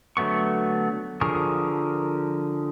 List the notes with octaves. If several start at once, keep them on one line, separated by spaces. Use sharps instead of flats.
D3 F#3 A3 B3 C#6
D3 F3 G#4 A#4 C#6